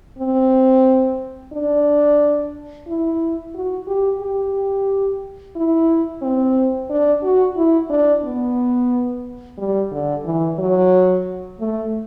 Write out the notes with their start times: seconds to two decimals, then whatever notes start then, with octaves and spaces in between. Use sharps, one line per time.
0.19 C4
1.53 D4
2.88 E4
3.55 F#4
3.88 G4
4.21 G4
5.56 E4
6.22 C4
6.90 D4
7.23 F#4
7.57 E4
7.90 D4
8.24 B3
9.58 G3
9.92 D3
10.25 E3
10.59 F#3
11.60 A3